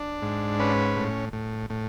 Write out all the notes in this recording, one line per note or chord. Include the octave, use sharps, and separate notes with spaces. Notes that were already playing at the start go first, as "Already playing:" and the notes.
Already playing: D4
G#2
C#4 B4
A2
A2
A2